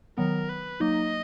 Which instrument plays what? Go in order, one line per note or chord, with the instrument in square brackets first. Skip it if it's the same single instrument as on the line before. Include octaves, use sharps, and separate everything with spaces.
[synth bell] D#3 F#3 B3 [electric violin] A#4
[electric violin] B4
[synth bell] F#3 A#3 D#4 [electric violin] D#5